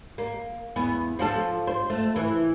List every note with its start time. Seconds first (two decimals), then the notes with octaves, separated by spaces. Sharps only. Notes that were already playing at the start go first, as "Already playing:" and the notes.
0.18 A#3
0.76 E2 B3
1.19 F3 F#4 A4
1.67 C5
1.90 A3
2.16 E3